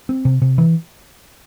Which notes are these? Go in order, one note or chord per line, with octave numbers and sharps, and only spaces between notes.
C4
C3
C3
E3